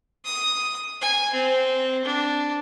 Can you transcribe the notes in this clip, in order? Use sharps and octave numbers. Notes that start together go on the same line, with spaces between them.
D#6
G#5
C4
D4